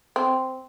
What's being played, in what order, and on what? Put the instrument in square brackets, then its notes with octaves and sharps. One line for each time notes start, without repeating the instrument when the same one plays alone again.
[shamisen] C4